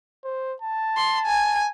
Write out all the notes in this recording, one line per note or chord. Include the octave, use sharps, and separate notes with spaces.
C5
A5
C6
G#5